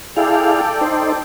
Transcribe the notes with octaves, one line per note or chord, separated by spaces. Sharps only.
E4 G#4 A4 D5 F5 G5
D#4 C5